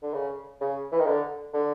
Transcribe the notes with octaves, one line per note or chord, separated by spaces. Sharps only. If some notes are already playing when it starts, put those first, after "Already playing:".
D3
C#3
C#3
E3
D#3
D3
D3